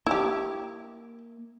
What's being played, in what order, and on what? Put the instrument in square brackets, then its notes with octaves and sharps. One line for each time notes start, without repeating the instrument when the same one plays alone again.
[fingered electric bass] A#3 [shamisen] E4 G4